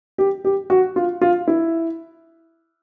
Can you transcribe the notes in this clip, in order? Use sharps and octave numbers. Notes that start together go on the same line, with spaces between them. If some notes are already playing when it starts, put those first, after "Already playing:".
G4
G4
F#4
F4
F4
E4